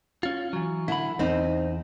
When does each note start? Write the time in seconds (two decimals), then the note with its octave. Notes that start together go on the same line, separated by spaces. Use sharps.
0.23 C#4 F4
0.53 E3 F#3
0.88 D3 E4 B5
1.19 E2 C4 D#4